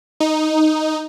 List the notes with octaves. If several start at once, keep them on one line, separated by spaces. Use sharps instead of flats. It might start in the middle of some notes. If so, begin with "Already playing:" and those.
D#4